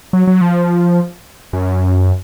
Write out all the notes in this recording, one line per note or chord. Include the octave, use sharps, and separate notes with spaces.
F#3
F#3
F3
F#2